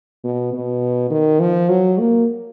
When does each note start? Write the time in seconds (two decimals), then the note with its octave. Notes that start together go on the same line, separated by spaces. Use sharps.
0.24 B2
0.53 B2
1.10 D#3
1.40 F3
1.69 F#3
1.99 A#3